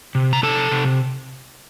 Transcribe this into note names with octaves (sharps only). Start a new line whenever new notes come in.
C3
A#5
C3 A4 A5
C3